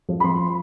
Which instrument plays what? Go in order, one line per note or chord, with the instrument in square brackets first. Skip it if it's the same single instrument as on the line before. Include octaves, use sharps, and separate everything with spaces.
[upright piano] F3
B5
F3 C6